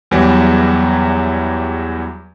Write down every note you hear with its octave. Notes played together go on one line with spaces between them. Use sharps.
E2 E3 F#3 G3